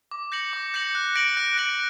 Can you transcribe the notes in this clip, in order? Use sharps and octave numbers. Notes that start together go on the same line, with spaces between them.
D6
G6 A#6 C#7 F#7
D6
G6 A#6 C#7 F#7
F#6
A#6 D7 F#7
F#6
A#6 D7 F#7